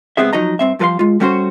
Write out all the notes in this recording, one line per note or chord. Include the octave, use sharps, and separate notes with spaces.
C#2 G2 B3 C4 G#4 E5
F3 F#3 D#4 D#5 A#5
G2 C4 E5
G2 F3 A4 B4 F5 C6
G#3 F4
G3 A3 C#4 F#4 B4 C5